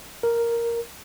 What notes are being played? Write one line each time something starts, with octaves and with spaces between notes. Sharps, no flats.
A#4